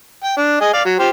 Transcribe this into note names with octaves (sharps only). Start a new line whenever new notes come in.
G5
D4
G#4 D#5
D5 F5
F#3
F4 G4 C5